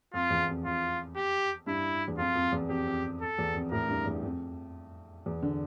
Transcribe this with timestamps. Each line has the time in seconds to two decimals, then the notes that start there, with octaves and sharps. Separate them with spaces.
0.14 F2 F4
0.30 E2
0.48 F2
0.64 F2 F4
1.16 G4
1.67 G2 E4
2.08 E2
2.18 F2 F4
2.35 F2
2.52 E2
2.69 F2 G4
2.87 F2
3.21 A4
3.38 E2
3.54 F2
3.72 A2 A#4
3.89 G2
4.06 E2
4.23 F2
5.26 E2
5.42 D3